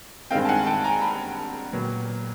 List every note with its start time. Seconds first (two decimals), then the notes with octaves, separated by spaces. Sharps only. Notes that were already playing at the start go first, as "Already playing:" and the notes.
0.31 G2 D#3 G#3 C4 F5 G5
0.45 A5
0.48 F#5 G#5
0.66 G5 A5
0.84 G#5 A#5
1.01 A5 B5
1.73 A#2 F#3 B3